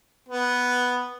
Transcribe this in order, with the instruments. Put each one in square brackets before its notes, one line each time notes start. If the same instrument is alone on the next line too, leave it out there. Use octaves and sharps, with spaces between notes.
[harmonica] B3